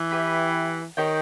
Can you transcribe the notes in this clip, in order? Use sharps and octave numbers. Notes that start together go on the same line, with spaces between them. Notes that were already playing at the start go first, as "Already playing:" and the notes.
Already playing: E3
B3 E4 G4 B4
D#3 D#4 G4 C#5 G5